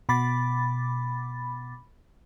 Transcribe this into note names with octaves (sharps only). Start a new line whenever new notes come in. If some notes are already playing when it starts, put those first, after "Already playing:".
B2 B5 D6 A6